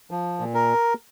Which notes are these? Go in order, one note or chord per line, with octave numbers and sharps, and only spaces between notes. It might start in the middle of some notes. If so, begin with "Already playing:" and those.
F3
A#2
A#4